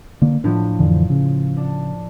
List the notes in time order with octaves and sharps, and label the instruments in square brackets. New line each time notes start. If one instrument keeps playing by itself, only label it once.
[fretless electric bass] D3 A#3
[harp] A2 F3 [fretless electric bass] D4
[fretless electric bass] F2 D3 E3
C#3
[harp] D4